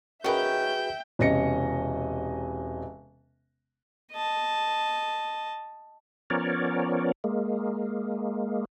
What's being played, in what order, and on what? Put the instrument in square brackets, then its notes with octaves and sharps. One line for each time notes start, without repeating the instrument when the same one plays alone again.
[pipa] D#3 C#4 [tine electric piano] F#4 G#4 B4 [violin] E5 G6 [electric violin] G5
[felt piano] E1 C3 C#4 D#5 A#6 C#7
[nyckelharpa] D#5 A5
[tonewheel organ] F3 B3 C#4 A#4 C#5 D5
G#3 A#3